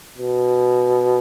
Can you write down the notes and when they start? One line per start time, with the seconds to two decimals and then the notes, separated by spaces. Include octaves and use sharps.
0.18 B2